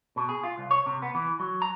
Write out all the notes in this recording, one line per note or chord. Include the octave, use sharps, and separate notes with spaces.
B2
G#4
F4
C2
C#5
C3
B3
E3
F#3
A#5